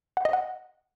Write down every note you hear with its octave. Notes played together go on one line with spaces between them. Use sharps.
F#5
D#5
F#5